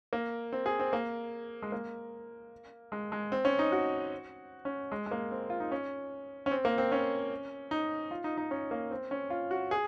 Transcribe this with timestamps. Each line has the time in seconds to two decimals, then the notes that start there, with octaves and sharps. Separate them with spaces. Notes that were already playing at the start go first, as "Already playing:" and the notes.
0.13 A#3
0.53 C4
0.66 G#4
0.79 C4
0.93 A#3
1.62 G#3
1.72 A#3
2.92 G#3
3.12 G#3
3.32 C4
3.45 C#4
3.59 D#4
3.72 F#4
4.65 C#4
4.92 G#3
5.06 G#3
5.11 A#3
5.31 C4
5.50 F4
5.60 D#4
5.72 C#4
6.46 C#4
6.51 C4
6.65 A#3
6.78 C4
6.92 C#4
7.71 D#4
8.11 F4
8.24 D#4
8.38 D#4
8.51 C#4
8.71 A#3
8.91 C4
9.11 C#4
9.30 F4
9.51 F#4
9.71 G#4